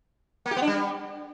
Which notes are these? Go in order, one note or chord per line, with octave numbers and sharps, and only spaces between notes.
A#3
G4
B3
D4
G3